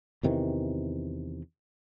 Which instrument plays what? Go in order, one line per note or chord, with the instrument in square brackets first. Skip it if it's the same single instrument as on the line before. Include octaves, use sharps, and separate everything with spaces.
[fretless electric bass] E2 C3 D#3 E3